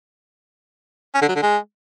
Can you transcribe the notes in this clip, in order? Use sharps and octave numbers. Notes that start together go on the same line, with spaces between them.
C#4
D3
F#3
D3
G#3